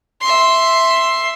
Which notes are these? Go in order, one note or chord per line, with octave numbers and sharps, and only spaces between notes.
E5 C6